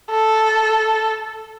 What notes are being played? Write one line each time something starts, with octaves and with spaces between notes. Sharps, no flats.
A4